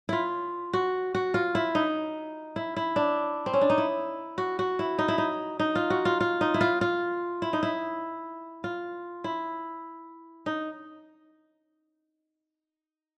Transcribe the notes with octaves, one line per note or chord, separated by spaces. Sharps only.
E4 F4
F#4
F#4
F4
E4
D#4
E4
E4
D4
C4
C#4
D4
D#4
E4
F#4
F#4
E4
D#4
E4
D#4
D#4
F4
F#4
F4
F4
D#4
E4
F4
F4
E4
D#4
E4
F4
E4
D#4